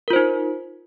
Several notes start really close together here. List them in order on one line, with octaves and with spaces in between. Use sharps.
A#4 F4 C5 D#4